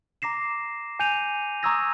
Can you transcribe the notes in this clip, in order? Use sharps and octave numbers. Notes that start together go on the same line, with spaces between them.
A#5 D6 A#6 C7 E7
G#5 G6 C#7 D#7 F7
A#5 C#6 D#6 E6 G#6 A#6